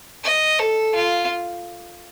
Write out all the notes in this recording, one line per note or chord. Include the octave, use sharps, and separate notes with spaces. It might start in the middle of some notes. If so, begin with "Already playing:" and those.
D#5
A4
F4